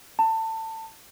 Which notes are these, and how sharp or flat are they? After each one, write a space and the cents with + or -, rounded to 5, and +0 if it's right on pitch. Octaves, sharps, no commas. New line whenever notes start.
A5 +25